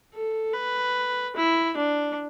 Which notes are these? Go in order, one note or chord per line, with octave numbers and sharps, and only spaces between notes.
A4
B4
E4
D4